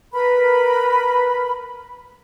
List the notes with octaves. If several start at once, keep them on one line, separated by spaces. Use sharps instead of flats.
A#4 B4 B5